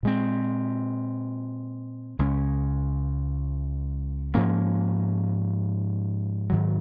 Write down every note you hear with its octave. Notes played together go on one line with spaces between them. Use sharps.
A#2 G#3 C4
C#2 C#3 G#3 C#4
G#2 F3 A#3 C#4
G#2 D#3 F#3